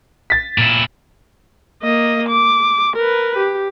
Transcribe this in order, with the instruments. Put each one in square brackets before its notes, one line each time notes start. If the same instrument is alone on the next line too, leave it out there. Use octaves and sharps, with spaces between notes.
[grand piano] A6 B6
[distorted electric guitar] A#2 E4
[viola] A#3 D#5
D6
A#4 B4
G4